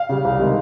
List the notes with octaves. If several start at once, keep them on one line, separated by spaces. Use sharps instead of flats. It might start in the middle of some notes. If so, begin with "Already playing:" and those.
Already playing: F5
C#3 G3
C2
C3 D#3 G#3